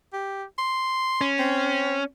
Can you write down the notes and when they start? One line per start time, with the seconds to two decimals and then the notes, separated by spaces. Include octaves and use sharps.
0.13 G4
0.58 C6
1.21 C#4
1.39 C4